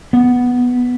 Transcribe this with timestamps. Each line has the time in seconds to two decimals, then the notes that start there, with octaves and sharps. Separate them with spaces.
0.13 B3